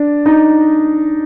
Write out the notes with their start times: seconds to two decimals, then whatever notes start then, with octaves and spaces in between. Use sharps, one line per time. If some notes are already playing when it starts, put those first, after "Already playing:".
Already playing: D4
0.25 D#4